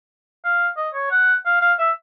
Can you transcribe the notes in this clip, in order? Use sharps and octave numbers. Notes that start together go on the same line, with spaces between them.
F5
D#5
C#5
F#5
F5
F5
E5